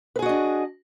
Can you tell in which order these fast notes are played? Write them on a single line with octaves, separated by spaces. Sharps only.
B4 G#4 F#4 D#5 D4